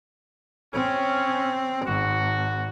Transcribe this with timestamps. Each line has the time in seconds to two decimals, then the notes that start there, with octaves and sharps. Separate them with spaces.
0.73 C4 C#4
1.85 G#1 G#2 F#4